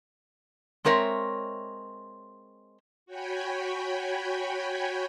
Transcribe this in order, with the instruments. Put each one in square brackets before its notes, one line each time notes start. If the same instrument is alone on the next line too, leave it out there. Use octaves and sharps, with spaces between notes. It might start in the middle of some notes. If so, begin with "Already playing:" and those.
[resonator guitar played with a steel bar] G#3 C4 A#4 C#5 E5
[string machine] F#4 C#5 G5 G#5 B5